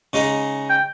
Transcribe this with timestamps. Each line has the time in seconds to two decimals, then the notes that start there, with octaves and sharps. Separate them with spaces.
0.13 C#3 G#3 D#4
0.70 G5